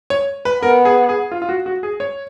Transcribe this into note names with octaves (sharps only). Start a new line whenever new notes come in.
C#5
B4
B3 A#4
G#4
G#4
F4
F4
F#4
F#4
G#4
C#5